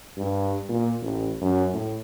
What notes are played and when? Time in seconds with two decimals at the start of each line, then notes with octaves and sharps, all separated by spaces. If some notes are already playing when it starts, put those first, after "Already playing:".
0.17 G2
0.69 A#2
1.02 A1
1.41 F#2
1.73 A2